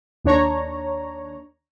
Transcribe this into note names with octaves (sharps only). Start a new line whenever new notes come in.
D#2 D4 C#5 A#5